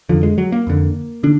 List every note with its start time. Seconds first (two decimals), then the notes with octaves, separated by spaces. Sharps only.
0.09 F2 D3 F3
0.23 G#3
0.38 F#3
0.52 A#3
0.67 F2 D3
1.23 D3 D4